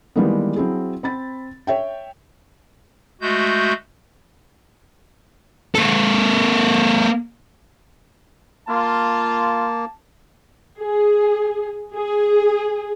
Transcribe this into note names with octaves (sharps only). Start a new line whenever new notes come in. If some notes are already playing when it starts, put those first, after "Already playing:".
D#3 E3 G3 G#3 A#3 B3
F#3 C4 E4 G#4
C4 B5 A6
C#5 E5 G5
G#3 A3 F#4 G6
A#3 A4
A#3 F4 A5
G#4
G#4